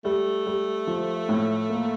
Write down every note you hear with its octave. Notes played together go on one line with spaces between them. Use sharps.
G3 A3
G3
F3
A2
A#3